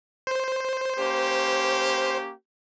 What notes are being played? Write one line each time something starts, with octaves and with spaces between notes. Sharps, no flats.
C5
A#3 C#4 G4